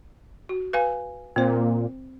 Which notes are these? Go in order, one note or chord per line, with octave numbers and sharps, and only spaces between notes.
F#4
B4 F5 G#5
A#2 C4 C5